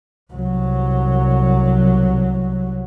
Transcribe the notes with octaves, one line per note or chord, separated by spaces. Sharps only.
C2 F#3